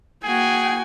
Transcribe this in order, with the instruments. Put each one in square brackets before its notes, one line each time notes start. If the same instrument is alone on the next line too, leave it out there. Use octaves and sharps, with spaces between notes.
[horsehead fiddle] A#3 G5 [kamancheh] F#4 G#5 [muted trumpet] G#4